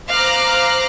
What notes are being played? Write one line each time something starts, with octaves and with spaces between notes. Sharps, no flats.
C5 F5 A#5 D6 F#6